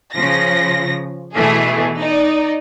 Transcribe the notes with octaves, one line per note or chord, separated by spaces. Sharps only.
C#3 F3 A#6
B2 E3 A3 G#4
D#4 D5